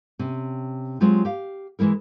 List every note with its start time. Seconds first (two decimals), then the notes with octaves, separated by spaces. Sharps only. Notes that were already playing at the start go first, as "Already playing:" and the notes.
0.19 C3 C#4
1.00 F#3 G#3 C4 F4 G4
1.25 G4 F5
1.79 E3 F3 G#3 E4 A#4